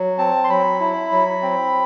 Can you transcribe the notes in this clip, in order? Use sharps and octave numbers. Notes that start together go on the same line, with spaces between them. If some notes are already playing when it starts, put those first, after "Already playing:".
Already playing: F#3
C4 A5
C6
F#3 B5
E4
F#3
C4